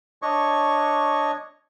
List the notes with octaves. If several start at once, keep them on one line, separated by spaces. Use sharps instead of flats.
D4 C#5 D#5 C#6